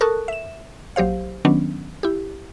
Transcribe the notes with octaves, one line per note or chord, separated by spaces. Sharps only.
A4 A#4 A5 C#6 D#6 F#6
E5 E7
A#1 F#3 G4 C5 F5
D#3 F#3 B3 C#4 D4
E4 G4